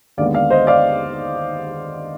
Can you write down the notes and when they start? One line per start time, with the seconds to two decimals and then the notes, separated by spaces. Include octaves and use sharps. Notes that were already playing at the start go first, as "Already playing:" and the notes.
0.17 D#2 D3 G#3 B3 D5 F5
0.34 D5 F5
0.50 C5 D#5
0.67 D5 F5